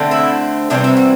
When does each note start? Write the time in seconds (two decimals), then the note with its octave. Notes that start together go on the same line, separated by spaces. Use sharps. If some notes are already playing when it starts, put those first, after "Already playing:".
Already playing: D3 A3 C4
0.11 E4
0.70 C3 E3 G3 C4 D4
0.84 E4
0.97 F#4